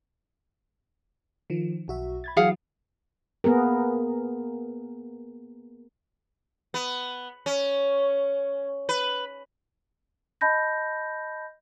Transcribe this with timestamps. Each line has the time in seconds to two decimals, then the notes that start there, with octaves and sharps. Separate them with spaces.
1.50 D#3 F3
1.88 B1 F#4 E5
2.24 B5 G#6 A6
2.37 E3 F#3 G#4 F5 F#5
3.44 A#3 B3 G#4 A#4
6.74 B3
7.46 C#4
8.89 B4
10.41 D#5 A5 B5 G6 A#6